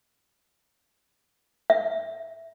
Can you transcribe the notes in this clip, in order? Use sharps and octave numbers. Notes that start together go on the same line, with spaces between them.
E5